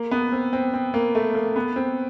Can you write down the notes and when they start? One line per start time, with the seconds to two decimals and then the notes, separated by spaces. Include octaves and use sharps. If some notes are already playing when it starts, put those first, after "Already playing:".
Already playing: A#3
0.11 B3
0.32 C4
0.53 C4
0.74 C4
0.94 A#3
1.15 A3
1.35 A#3
1.56 B3
1.76 C4